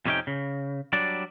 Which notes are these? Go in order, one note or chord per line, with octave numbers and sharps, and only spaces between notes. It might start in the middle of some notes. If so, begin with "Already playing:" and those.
F2 C3 F3 C#4 D#4 G5
C#3
F#3 G3 D4 D5